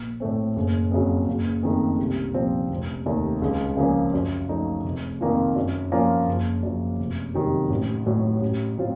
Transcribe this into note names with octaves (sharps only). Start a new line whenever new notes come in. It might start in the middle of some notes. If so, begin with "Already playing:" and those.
Already playing: A#1
A2 A3 C4
F#1
F2 C#3 F#3
F#1
F2 D#3 A3
C2
A#2 F3 C4
F1
D#2 D#3 A3
C#2
C#3 F3 A#3 C#4
F#2
F3 A3 D#4
F1
F2 D#3 A#3 F4
F#2
F3 A#3 C#4 F4
F#1
F#2 F3
F1
F2 C3 D#3 F#3
A1
A2 F#3
A1
A2 F#3 C4 F4